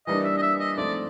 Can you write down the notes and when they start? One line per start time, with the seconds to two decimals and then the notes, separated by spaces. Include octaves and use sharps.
0.07 E3 G3 A#3 D4 D#5
0.25 E5
0.38 D#5
0.42 E5
0.60 D#5
0.77 G#2 F3 A3 C4 D5